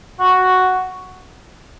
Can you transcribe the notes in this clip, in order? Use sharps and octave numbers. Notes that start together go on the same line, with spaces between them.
F#4